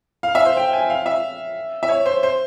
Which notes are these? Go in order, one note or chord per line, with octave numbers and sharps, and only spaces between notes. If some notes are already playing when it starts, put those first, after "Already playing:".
F5
E5
C5
G5
G#5
F5
E5
E5
C#5
C5
C5